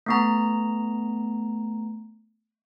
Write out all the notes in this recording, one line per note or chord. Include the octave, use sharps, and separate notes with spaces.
A3 B3 A#5